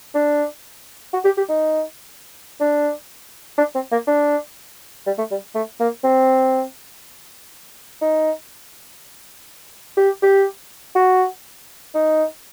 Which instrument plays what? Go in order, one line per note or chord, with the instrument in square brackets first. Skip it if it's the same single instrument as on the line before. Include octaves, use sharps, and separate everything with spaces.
[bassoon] D4
F#4
G4
G4
D#4
D4
D4
C4
A#3
D4
G3
A3
G3
A3
A#3
C4
D#4
G4
G4
F#4
D#4